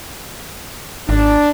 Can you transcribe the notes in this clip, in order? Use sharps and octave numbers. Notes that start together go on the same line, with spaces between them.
G#1 D4